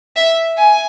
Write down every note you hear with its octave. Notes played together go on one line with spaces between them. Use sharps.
E5
G#5